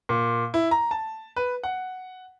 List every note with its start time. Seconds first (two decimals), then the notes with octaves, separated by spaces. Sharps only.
0.09 A#2
0.54 E4
0.71 A#5
0.91 A5
1.36 B4
1.63 F#5